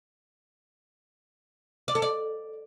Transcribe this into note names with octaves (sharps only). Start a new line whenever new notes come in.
D5
A4
D5